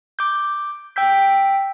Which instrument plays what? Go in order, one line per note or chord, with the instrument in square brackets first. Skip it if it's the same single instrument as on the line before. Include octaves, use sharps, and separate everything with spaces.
[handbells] D6 G6
G5 E6 G6 B6